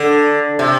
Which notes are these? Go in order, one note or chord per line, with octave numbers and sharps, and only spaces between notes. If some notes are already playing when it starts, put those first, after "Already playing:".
Already playing: D3
C3